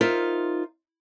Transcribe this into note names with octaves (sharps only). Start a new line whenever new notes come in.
D#4 F4 A#4 C5 E5